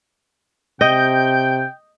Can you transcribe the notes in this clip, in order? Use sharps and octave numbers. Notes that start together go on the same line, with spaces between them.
C3 D#5 G5 G6